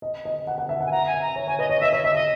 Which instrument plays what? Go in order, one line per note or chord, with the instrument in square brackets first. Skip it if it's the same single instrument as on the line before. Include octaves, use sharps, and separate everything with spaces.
[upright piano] D#5
D#5
F#5
F#5
E5
F#5
[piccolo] G#5
[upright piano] F#5 [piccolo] A#5
[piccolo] G#5
[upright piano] E5
[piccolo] A#5
[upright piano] C#5
[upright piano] C#5 [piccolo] G#5
[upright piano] B4 [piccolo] D#5
[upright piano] C#5 [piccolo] D#5
[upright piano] D#5 [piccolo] E5
[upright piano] C#5 [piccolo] E5
[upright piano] D#5 [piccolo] E5
[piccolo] D#5 [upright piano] E5